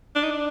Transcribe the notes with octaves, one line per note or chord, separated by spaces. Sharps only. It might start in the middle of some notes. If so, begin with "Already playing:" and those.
D4
D#4
D4